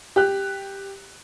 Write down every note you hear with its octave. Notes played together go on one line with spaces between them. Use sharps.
G4 F#6